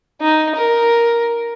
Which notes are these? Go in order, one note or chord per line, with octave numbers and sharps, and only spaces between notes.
D#4
A#4